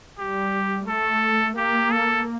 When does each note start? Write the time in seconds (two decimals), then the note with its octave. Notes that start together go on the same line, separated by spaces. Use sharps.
0.19 G3 G4
0.87 A3 A4
1.56 A#3 G4
1.91 A4